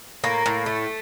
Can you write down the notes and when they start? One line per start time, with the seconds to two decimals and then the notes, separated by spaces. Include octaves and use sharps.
0.23 A2 A#3
0.46 A2
0.66 A3